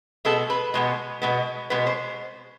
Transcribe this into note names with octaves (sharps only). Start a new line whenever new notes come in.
B2 G#3 B3 A4
B4
B2 G#3 B3
B2 G#3 B3
B2 G#3 B3 B4
C5